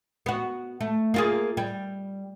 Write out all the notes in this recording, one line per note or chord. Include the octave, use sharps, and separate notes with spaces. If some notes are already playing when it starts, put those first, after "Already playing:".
B3 F#4
A3
A#3 F4 G#4
G3